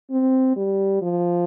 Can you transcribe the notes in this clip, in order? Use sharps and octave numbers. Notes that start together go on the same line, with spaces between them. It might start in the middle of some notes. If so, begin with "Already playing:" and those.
C4
G3
F3